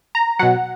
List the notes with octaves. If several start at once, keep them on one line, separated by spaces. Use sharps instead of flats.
A#5
B2 F#3 F#5